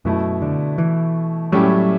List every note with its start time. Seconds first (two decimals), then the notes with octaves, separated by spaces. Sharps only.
0.05 F#2 B2 A3 E4
0.42 D3
0.78 E3
1.52 A2 F#3 G3 C#4 E4 G4